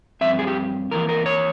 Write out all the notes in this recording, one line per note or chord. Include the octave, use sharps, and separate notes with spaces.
G2 F3 C4 E5
G#4
G4
F2 E3 A#3 A#4
A#4
C#5